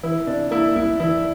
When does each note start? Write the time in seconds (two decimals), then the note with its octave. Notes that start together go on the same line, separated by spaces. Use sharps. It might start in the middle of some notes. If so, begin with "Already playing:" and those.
0.03 E3 E4
0.27 C3 D4
0.51 A#3 E4
0.75 C2 E4
1.00 E3 E4